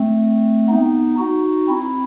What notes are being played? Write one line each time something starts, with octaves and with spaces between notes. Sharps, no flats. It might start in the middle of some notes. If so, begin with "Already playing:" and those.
Already playing: A3 C4
B3 D#4
D#4 F#4
C4 E4